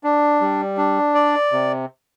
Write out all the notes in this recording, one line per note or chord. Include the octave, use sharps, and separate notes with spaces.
D4
G3
D4
D5
C3